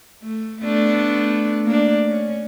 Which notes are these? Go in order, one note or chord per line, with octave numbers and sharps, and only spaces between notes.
A3
A3 B3 D4
A#3 D4
C#4